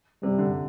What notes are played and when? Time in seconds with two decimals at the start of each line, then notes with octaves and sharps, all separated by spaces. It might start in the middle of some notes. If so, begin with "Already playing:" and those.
0.23 C3 G3
0.38 D3